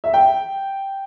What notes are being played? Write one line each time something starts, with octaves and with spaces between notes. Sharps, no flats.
E5
G5